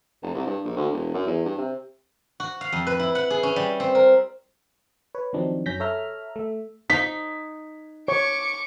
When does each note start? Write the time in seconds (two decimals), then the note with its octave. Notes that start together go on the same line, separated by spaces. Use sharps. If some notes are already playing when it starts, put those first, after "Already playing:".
0.23 F1
0.35 C2
0.47 G2
0.64 A#1
0.77 D2
0.92 E1
1.14 F#2
1.27 E2
1.46 G2
1.58 C3
2.40 F#4
2.61 F5
2.72 F2
2.87 B4
2.99 E4
3.15 F#5
3.30 G#4
3.43 C#4
3.56 G3
3.80 C4
3.95 A#4
5.15 B4 C#5
5.33 D#3 F3 F#3 C4 D4 D#4
5.66 F#2 C#4 G6 A#6 B6
5.80 A4 C#5 E5 A#5 F6
6.36 A3 E5
6.90 D#4 B6
8.08 C#5 C#6 D6